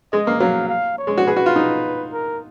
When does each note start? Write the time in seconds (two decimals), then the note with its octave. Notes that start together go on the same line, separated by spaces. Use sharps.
0.13 G#3 D#5
0.27 A#3
0.40 F#3 F5
0.69 F5
0.98 C#5
1.07 G#3
1.17 F#4
1.27 G#4 B4
1.36 F#4
1.46 F4
1.56 D#4
2.13 A#4